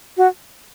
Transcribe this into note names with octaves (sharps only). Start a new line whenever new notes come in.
F#4